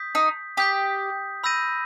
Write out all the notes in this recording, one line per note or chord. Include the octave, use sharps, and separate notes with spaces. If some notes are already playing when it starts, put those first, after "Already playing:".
Already playing: D#6 G6 B6
D#4
G4 D#6 G6 B6
B5 E6 G6 A#6 D#7